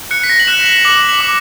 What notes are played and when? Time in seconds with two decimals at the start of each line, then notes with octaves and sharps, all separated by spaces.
0.11 F#6 C#7
0.24 B6
0.30 A#6
0.39 F#7
0.47 F#6 E7
0.65 F#7
0.85 D6 F#7
1.09 F#7
1.20 D6